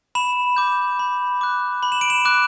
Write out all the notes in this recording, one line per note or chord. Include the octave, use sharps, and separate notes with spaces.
B5 E7
D6 G6
B5
D6 F#6
B5 F#7
E7
D7
E7
D6 F#6